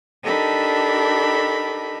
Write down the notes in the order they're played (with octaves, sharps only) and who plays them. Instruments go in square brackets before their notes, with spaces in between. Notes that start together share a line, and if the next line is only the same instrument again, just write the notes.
[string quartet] D4 D#4 G4 A4 A#4 B5